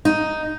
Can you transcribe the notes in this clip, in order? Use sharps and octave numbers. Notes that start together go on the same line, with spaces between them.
D#4